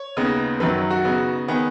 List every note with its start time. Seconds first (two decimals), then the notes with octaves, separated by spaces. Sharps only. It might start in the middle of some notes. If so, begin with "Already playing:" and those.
Already playing: C#5
0.17 D#2 C#3 B3 D#4
0.60 F#2 D#3 F#3 B4
0.90 F#4
1.05 C#3 B3 D#4
1.48 D#3 B3 G#4